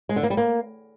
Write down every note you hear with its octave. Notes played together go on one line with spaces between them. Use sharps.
G#3
D3
A#3
G3
A#3